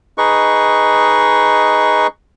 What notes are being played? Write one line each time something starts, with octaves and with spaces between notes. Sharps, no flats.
D#4 G#4 B4 D#5 C#6